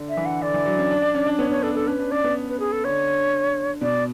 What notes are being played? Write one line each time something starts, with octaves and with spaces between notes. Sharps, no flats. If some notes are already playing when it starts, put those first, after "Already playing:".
Already playing: D3
E5
E3
F#5
D3 D5
E3
F#3
C#4
D4
D4
C#4
D4
B3 C#5
C#4 C#5
D4 A4
D4 A4
C#4 B4
D4
C#4 D5
B3
B4
G#4
A4
D3 C#5
B2 D5